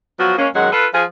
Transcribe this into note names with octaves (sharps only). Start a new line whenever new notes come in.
F3 F#3 B3 F#4
G#3 A#3 C#4
F#2 D#3 F#3 G#3 F#5
F4 A4 B4
F3 G#4